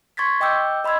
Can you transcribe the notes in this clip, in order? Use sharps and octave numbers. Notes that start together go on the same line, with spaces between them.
C6 C#6 G#6 A6 B6
D#5 G5 D6 E6 G6
D#5 B5 C6 E6 G#6